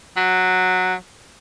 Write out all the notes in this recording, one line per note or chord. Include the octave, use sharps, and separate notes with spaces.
F#3